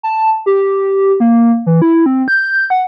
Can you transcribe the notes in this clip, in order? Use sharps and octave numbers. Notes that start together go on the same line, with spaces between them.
A5
G4
A#3
E3
E4
C4
G6
F#5